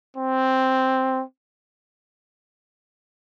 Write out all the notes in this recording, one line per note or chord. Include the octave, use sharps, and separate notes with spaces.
C4